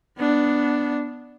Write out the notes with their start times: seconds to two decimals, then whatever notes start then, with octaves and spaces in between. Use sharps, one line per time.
0.17 B3 D4